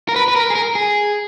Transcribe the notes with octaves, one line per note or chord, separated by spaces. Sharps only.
A#4
B4
B4
A#4
G#4
A#4
G#4